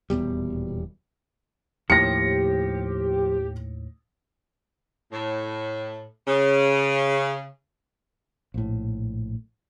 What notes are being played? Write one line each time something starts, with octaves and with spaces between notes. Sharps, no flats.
D#1 E2 B2 G3
D#2 A2 F3 G4 A#6 C#7
A2
C#3
A#1 A2